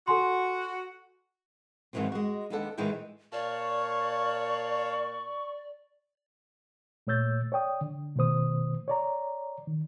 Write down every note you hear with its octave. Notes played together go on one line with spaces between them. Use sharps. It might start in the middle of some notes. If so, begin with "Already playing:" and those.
F#4 A4 G#5 C6
F2 G#2 D#3 E3 F#3 C4
G#3 F#4
D#2 G#3 B3 D4 A4 F#5
A2 D#3 E3 G#3 B3 G5
A#2 C#5 D5 F5 A5 C#6
A#2 A3 C#5 E6 G6 A6
C#5 D5 G5 D#6
D3
B2 D#3 A3 C5 D#6
C#5 D5 A#5
D#3